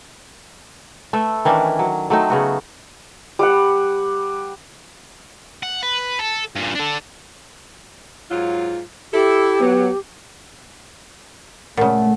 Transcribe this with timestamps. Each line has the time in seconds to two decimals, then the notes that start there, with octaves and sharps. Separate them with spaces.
1.13 A3 A4 B4 E5
1.45 D#3 E3 C#4 D4
1.79 F#3
2.10 F#3 A3 C4 D#4
2.30 C#3 B3 F#4
3.39 G3 F#5
5.63 F#5
5.83 B4
6.19 A4
6.55 G2 A#2
6.75 D4 A4
8.31 G#2 F#3 F4
9.13 E4 G4 A4
9.60 F#3 B3
11.77 A#2 C#3 A3 F#5